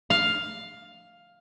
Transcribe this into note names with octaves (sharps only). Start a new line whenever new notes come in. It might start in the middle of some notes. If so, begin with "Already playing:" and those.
F5